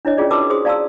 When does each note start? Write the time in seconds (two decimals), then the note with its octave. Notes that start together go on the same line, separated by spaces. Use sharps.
0.05 D4 E4 C#5 D#5
0.17 C#4 F4 G#4 D5
0.30 F#4 A#4 B4 A5 D6 E6
0.50 G#4 C5 C6 D#6
0.65 D5 F5 A5 A#5 C6 E6